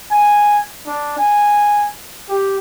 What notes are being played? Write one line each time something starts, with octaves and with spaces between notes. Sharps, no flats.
G#5
D4
G#5
G4